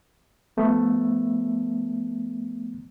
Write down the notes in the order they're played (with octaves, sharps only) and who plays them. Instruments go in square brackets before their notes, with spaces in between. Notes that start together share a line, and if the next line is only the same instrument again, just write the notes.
[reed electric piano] F3 A3 B3